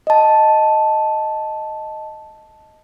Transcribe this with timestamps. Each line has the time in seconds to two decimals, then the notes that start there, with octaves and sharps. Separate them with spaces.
0.07 D#5 A5